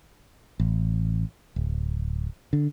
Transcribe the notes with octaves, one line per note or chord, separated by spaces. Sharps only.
A1
D1
D3